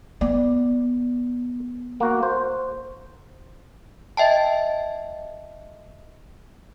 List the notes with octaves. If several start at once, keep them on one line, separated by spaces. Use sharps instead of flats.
B3 D5
A#3 F#4
C5
D#5 E5 G5 A5